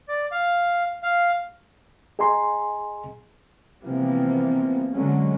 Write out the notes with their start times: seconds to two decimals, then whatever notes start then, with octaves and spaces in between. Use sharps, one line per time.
0.08 D5
0.32 F5
1.03 F5
2.19 G#4 D#5 G#5 A#5 C6
3.83 C3 E3 F3 G3 A#3 B3
4.92 D3 F#3 G#3 C#4